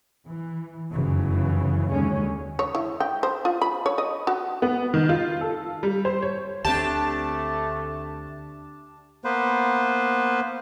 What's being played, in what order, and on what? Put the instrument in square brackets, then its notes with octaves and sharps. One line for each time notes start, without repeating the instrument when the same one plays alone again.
[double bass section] E3
F1 F#2 C#3 E3
D#2 D3 G#3 C#4
[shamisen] C#5
E4
G5
C5
F4
B5
C#5
D#5
F#4
[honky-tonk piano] B3
D#3
F4
A4
G3
C5
C#5
[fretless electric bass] D2 C4 [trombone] A3 [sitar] D4 G4 [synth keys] A5
[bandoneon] A#3 B3 B4 C5